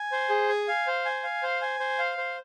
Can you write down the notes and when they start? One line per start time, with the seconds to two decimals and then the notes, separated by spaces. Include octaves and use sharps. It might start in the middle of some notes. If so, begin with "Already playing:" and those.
Already playing: G#5
0.12 C5
0.30 G#4
0.49 G#5
0.68 F5
0.87 C5
1.05 G#5
1.23 F5
1.43 C5
1.61 G#5
1.80 C5
1.99 F5
2.18 C5